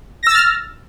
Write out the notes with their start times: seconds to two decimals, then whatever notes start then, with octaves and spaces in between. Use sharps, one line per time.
0.23 A#6
0.27 E6
0.31 A6
0.35 F6